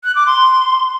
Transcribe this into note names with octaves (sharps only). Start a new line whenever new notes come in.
F#6
D6
C6